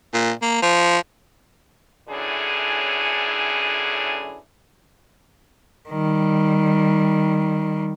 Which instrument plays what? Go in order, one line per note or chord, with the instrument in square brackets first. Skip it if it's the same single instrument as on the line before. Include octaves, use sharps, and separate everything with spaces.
[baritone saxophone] A#2
A#3
F3
[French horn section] F#2 A2 D3 E3 C#4 G#4
[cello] D#3 G3